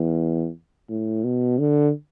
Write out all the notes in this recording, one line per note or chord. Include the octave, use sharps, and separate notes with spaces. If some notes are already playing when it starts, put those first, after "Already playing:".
Already playing: E2
A2
B2
D3